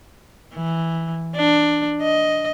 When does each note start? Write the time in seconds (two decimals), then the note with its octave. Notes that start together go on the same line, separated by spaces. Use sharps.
0.54 E3
1.36 D4
2.02 D#5